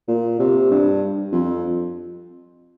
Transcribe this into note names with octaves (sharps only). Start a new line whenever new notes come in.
A#2
C3
G2
F2